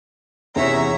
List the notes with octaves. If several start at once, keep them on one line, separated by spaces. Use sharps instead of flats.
E2 C3 C#4 D#4 G#4 C#5 E5 A#5